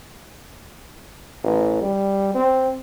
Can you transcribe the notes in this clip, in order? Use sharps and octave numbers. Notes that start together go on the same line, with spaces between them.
A1
G3
C4